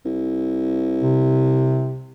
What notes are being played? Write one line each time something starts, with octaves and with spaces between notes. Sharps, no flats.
C2
C3